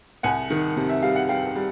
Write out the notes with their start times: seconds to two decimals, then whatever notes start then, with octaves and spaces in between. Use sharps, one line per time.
0.23 C2 F#5 G#5
0.50 D#3
0.76 C3
0.89 E5
1.02 G3 F5
1.16 F#5
1.29 G3 F5 G5
1.55 G3